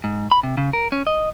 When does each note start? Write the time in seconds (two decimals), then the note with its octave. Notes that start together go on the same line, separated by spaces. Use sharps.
0.04 G#2
0.31 B5
0.43 C3
0.57 C#3
0.73 A#4
0.92 C#4
1.07 D#5